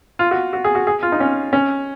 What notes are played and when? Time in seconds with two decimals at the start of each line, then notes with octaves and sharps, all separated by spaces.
0.19 F4
0.31 F#4
0.53 F#4
0.64 G#4
0.75 F#4
0.87 G#4
1.03 F4
1.12 D#4
1.20 C#4
1.53 C#4